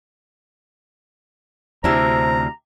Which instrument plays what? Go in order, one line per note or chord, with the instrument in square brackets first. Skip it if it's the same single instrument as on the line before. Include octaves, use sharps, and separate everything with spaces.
[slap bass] D2 C3 [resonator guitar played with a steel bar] D4 E4 G4 [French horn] C5 [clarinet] A#5